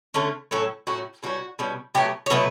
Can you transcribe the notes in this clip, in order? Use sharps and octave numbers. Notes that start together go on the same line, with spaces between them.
D3 A3 C#4
A2 F#3 C#4 A4
A2 F#3 C#4 F#4
B2 G3 C#4 F#4
B2 G3 C#4
B2 F#3 A3 G4
C#5
B2 F#3 A3 B4